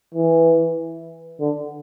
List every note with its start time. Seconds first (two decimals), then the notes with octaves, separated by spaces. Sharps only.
0.14 E3
1.40 D3